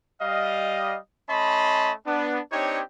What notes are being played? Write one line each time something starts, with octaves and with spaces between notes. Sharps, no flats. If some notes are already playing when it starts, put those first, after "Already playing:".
G3 D#5 F5
A3 C#4 D#5 A5 B5 C6
B3 D4
C4 D4 D#4 G4 C#5